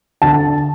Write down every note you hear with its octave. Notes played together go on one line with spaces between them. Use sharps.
D3 A5